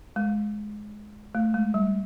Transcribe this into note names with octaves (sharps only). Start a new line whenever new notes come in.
G#3
A3
G#3
G3